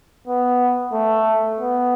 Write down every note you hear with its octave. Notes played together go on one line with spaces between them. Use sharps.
B3
A3
B3